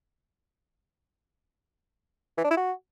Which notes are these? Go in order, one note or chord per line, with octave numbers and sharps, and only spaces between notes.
E3
D4
E4
F#4